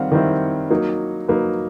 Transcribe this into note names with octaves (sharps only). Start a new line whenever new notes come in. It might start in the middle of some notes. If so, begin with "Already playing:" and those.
Already playing: D#3 G3 C4 F5 F#5
D#3 G3 C4 E4
F#3 A#3 D#4
F#3 A#3 D#4 B4